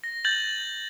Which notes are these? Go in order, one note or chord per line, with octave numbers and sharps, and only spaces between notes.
A#6
G6 A6 F#7